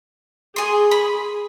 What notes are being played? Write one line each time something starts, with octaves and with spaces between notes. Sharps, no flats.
G#4 G#5 C6
B5